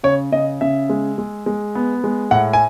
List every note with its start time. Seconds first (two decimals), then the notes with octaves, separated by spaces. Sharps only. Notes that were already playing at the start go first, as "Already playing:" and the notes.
0.03 C#3 C#5
0.32 C#3 D#5
0.61 C#3 E5
0.90 G#3
1.18 G#3
1.46 G#3
1.75 B3
2.04 G#3
2.31 A2 F#5
2.53 G#5